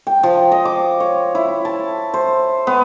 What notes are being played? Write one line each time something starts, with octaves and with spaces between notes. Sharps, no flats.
G5
F3
D#5
D6
C#5
E4
A5
C5
B3